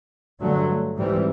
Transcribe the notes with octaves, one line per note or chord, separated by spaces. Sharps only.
G2 D3 F#3 A3
G#2 E3 G3 C4